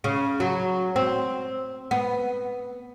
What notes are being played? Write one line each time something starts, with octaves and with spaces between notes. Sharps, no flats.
C#3
F#3
C4
B3